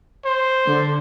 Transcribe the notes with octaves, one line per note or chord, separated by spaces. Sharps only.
C5
D3